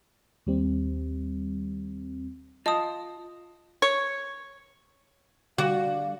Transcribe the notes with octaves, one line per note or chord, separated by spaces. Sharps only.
D#2 G3 C4
F4 D#5 A5 D#6
C#5
D3 G3 F#4 D5 F5